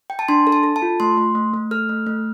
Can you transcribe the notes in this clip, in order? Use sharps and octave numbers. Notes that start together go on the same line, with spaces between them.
G5
A5
D4 C6
A4
A5
A4
A5
F4
A3 C6
A3
A3
A3
A4 F6
A3
A3